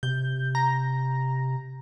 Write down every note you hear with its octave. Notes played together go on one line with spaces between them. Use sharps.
C3 G6
A#5